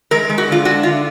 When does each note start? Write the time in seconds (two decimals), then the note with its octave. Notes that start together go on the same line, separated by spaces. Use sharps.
0.11 G#3 A#4
0.30 G#3
0.38 F#4
0.48 D3 F4
0.65 D4 F#4
0.83 D3 F4